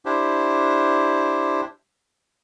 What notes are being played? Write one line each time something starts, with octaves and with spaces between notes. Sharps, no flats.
D4 E4 G4 C5